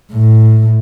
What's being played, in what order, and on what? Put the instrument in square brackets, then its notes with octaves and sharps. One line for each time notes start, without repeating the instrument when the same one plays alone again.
[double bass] A2